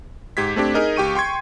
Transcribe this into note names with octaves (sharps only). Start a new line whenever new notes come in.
G#2 G4 G#6 B6
A3 C4 D4 G4
D#4 G#4 A#4 D#5
C#2 G4 G5 C#6 D#7
G5 C6 C#6 G#6